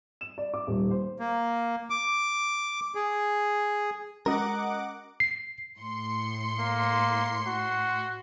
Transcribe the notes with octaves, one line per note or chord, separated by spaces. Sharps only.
E7
D5
D6
D#1
C5
A#3
D6
G#4
G#3 C#4 F#4 A#4 D#5 F#5 D6 A#6
C7
A2 C6 C#7
A#3
F#4